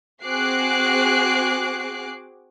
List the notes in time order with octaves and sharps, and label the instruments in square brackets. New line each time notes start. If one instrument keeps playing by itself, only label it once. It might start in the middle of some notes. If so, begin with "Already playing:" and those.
[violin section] C4 F#4 G#4 D6 F#6 C7